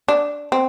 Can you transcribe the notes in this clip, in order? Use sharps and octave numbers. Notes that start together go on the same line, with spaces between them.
D4
C4